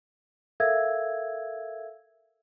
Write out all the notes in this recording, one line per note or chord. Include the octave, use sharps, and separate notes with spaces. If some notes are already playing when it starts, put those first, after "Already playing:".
A4 A#4 E5 F5 E6 G#6